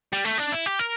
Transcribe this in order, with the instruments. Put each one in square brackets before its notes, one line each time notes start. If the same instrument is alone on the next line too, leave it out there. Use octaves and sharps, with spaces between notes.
[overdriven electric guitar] G3
A3
D4
E4
G4
A#4